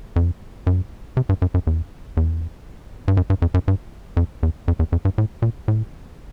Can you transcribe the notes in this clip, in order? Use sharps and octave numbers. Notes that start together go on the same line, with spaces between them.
F2
F#2
C3
G2
F#2
F#2
E2
E2
G2
F#2
G2
F2
F#2
G2
F2
E2
F2
E2
F2
G2
A2
A#2
A2